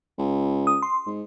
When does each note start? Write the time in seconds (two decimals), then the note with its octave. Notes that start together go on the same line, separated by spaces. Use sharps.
0.18 C#2
0.67 D#6
0.82 C6
1.06 G#2